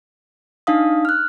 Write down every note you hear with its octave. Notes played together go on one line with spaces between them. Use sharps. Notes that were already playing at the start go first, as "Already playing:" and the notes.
D4 D#4 F5 D#6
F6 F#6